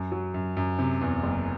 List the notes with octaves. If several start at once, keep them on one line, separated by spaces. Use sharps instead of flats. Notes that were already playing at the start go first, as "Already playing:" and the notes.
Already playing: F#2
F#3
F#2
F#2
C3
E2
F#1